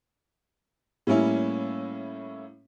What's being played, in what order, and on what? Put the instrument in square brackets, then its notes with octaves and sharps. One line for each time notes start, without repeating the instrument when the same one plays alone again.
[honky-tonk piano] A2 G3 A#3 C#4 E4